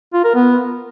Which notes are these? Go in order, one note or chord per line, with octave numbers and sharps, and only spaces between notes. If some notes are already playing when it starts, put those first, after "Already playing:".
F4
A#4
B3